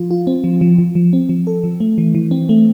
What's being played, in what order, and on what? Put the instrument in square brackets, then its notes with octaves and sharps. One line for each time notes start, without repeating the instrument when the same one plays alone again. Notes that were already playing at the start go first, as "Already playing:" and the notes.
Already playing: [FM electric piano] F3 F4
F4
C4
F3
F3
F3
F3
C4
F3
A4
F3
A3
E3
E3
C4
A3